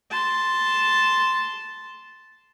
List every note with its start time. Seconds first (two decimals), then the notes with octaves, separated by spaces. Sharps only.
0.10 A5 C6